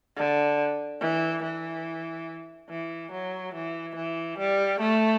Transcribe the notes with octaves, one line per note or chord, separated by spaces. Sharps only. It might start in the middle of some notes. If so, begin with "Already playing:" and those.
D3
E3
E3
E3
F#3
E3
E3
G3
A3